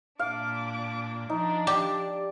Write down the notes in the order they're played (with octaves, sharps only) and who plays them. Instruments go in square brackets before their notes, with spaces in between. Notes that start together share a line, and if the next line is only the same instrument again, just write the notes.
[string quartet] A#2 D4 D6 [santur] F5
[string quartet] F3 D4 [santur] D#4
[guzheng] G4 [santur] D5